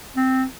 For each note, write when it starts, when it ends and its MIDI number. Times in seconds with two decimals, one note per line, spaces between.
0.16 0.45 60